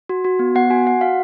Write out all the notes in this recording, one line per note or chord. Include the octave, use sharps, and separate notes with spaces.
F#4
F#4
B3
B3 F#5
F#4 G#5
F#4 F#5
F#4 F5